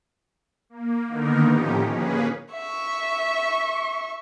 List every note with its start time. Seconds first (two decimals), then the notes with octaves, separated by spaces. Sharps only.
0.70 A#3
1.08 D3 D#3 A#3 B3 D#4 A#4
1.46 A2 F3 C#4 D#4 G4
1.90 A#3 C#4 G#4 B4
2.52 E5 C#6